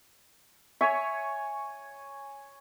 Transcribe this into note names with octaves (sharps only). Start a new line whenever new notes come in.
C#5 E5 G#5 C#6